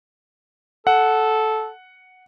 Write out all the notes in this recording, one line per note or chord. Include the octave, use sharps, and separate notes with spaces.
A4 F#5